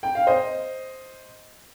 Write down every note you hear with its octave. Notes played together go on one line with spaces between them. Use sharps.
G5
F5
C5 D#5